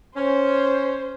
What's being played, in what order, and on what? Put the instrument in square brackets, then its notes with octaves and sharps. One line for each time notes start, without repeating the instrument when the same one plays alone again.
[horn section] C#4 [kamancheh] C5